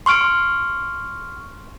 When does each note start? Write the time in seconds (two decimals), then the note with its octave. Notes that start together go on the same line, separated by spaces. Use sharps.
0.06 C6 C#6 F6 D7